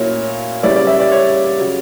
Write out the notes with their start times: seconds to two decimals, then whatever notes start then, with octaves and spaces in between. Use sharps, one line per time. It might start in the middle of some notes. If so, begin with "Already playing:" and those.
Already playing: A#2 F#3 A#3 C#4 E4 C#5
0.63 C#3 G3 A#3 C#4 E4 D5
0.76 D5
0.87 E5
1.00 D5
1.11 C#5
1.59 C#3 F#3